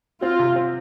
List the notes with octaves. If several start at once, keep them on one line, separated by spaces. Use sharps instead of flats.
C4 F4
C3
C4